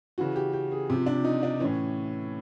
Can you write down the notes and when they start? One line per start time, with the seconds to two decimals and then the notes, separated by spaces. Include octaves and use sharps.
0.18 C#3 E3 F#4
0.36 G4
0.53 G4
0.72 G#4
0.90 C3 F3
1.06 D4
1.25 D#4
1.43 D4
1.60 A2 E3 C#4